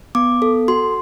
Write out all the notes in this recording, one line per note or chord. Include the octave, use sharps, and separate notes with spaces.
B3 D6
A4
F#4 C6